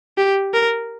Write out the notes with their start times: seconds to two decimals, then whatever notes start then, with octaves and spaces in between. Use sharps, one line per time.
0.18 G4
0.54 A#4